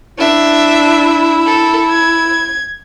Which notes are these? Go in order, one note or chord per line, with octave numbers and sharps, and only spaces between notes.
D4 E4 E5
A4
G#6